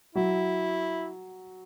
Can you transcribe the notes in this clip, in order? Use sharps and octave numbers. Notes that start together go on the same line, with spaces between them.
F#3 E4